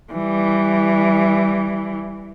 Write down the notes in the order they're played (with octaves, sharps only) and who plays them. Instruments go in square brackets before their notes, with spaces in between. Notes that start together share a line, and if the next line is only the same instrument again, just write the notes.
[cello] E3 G3